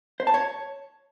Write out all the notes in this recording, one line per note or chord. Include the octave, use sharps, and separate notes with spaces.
C5
A5
C#5